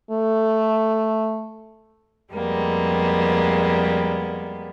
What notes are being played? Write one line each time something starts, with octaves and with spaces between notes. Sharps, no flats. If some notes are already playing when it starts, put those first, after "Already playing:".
A3
F2 G3 G#3 A#3 B3